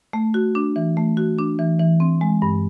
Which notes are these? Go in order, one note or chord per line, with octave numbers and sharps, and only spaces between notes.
A3
F#4
D4
E3
A3
F#4
D4
E3
E3
C4
G#3
G2